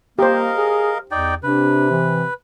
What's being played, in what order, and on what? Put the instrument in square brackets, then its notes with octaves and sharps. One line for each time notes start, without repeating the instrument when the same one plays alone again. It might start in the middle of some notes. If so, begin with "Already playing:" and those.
[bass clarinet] A#3 [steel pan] G4 C5 [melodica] A#4 D#5 F5
[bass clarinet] G#4
[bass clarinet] E2 [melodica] D#4 D5 G5
[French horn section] C3 [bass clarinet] D4 [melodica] B4
[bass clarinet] E3